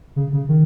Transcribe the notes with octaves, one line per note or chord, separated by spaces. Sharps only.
C#3
C#3
D#3